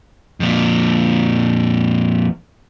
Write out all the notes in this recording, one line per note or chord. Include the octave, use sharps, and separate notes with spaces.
F2 A#2